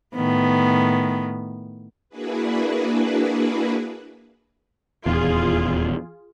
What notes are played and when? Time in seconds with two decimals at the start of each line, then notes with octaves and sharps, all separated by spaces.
0.15 A2 D#3 B3
2.09 A#3 D4 E4 F#4 G#4 B4
5.06 D#1 E2 F4 G#4